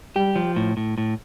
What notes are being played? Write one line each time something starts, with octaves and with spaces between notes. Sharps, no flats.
G3 G4
F3
A2
A2
A2